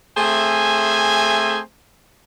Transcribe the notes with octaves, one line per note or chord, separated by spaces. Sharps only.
A3 C4 G#4 C5 E5 G#5